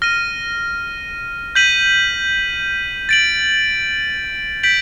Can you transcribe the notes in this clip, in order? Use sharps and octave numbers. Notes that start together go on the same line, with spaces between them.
F6 A#6 D#7
G6 B6 D#7 F#7
A6 D7 F#7
G6 B6 D7 F#7